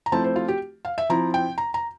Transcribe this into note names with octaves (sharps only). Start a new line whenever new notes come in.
A#5
F3 A3 C4 E4 A5
C5
F4
G4
F5
E5
F3 C4 E4 A#5
G5
A#5
A#5